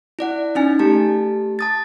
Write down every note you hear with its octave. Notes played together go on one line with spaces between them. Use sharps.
E4 D5 F#5
C#4 D#4 G#5
A3 G4 A5
A5 D#6 A6